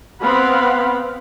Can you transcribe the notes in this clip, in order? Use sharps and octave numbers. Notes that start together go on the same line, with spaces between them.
B3 C4 F5 F#5 B5